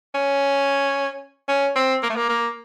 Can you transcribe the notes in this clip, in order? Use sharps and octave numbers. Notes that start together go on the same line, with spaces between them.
C#4
C#4
C4
A#3
A3
A#3
A#3